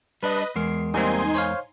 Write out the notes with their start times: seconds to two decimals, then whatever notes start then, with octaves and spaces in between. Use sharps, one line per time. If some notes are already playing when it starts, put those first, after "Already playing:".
0.23 G3 D4 B4 D#5
0.56 E2 G#3 A#4 C7
0.94 G3 A#3 C4 D#4 G#5 C6
1.35 C5 C#5 F5